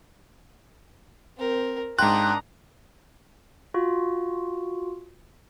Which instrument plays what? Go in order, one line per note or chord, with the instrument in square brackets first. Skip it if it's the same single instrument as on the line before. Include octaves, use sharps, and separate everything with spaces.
[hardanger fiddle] C4 A#4
[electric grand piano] G#2 F#6 [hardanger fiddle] D4 D#6 [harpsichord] F4 G5 [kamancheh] A#5
[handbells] F4 F#4